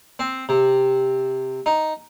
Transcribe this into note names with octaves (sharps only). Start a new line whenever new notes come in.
C4
C3
D#4